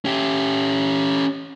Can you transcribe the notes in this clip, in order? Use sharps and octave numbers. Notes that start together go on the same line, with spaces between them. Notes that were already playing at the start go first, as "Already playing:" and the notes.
C#4 G4